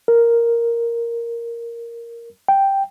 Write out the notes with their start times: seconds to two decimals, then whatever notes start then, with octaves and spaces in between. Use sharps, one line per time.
0.08 A#4
2.48 G5